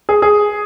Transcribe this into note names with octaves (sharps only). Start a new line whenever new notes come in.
G#4
G#4